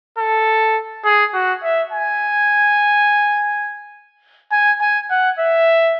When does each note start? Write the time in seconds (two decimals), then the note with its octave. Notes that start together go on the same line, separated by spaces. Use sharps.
0.18 A4
1.05 G#4
1.34 F#4
1.63 E5
1.92 G#5
4.52 G#5
4.81 G#5
5.10 F#5
5.39 E5